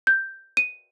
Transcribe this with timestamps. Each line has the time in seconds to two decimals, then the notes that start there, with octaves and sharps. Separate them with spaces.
0.07 G6
0.57 D#7